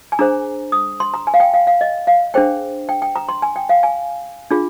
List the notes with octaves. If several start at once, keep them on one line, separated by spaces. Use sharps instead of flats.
G#5
D4 G#4 C5 A#5
D#6
C6
A#5
G#5
F5
G5
F5
F5
D#5
F5
D4 G#4 C5 G5
G5
G5
A#5
C6
G#5
G5
F5
G#5
D4 F4 G#4